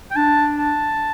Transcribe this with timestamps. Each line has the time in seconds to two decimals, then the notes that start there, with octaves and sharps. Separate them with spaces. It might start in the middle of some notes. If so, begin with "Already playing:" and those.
0.11 G5
0.16 D4 A5
0.58 A5